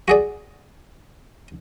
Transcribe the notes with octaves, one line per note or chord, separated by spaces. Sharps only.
F#4 G#4 D5